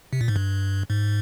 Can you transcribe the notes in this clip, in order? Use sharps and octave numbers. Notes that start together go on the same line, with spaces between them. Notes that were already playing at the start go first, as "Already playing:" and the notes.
C3
A#2
G#2
G2
G#2